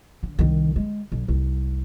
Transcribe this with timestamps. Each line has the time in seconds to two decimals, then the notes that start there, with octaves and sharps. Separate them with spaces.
0.23 D3
0.39 C2 D#3
0.76 G#3
1.12 B1
1.28 F1 C2